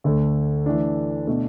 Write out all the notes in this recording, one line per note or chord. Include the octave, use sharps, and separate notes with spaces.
D2 D3 A3
E3 A3 D4
B2 A3 D4 A4